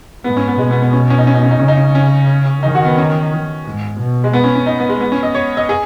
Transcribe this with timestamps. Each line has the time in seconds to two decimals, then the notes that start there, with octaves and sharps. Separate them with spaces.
0.24 G#2 B3
0.37 C#4
0.48 B3
0.58 B2 G#3
0.71 B3
0.82 B3
0.93 C#4
1.10 C#4
1.18 D#4
1.27 C#4
1.34 D#4
1.43 C#4
1.51 D#4
1.59 C#3 C#4
1.68 D#4
1.77 C#4
1.95 C#4
2.62 D#3 D#4
2.75 F#4
2.85 B3
2.97 C#4
3.65 G#2
3.99 B2
4.24 G#3
4.33 B3
4.44 C#4
4.55 C#4
4.66 D#4
4.79 B3
4.89 G#3
5.00 B3
5.12 C#4
5.23 D#5
5.35 C#5
5.57 D#5
5.69 G#4